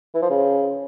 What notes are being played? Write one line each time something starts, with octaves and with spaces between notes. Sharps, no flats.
E3
F3
C#3